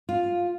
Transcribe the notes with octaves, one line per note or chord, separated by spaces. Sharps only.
F4